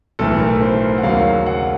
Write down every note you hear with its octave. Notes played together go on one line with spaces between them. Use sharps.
B1 A2 E3 A3 A4
A#4
C5
F#5
D#2 C#3 F#3 A#3 F5
F#5